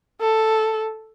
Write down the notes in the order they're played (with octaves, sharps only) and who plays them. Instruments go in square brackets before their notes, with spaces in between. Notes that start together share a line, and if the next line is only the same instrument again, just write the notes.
[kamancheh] A4